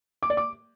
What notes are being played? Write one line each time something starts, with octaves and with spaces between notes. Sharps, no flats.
D6
D5
D6